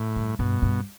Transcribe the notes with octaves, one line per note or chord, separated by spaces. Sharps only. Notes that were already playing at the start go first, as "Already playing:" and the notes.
Already playing: A2
G2
G2 B2
G2